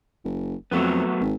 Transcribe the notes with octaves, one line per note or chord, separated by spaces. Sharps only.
F#1
F2 F#3 A3 B3
G#1